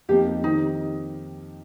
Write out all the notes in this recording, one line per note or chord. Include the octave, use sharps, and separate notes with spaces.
F2 F3 A#3 D#4 G4
D#3 C4 D#4 G4